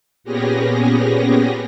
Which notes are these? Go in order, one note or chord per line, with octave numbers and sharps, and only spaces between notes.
A#2 B3 C#4 G4 G#4 A#6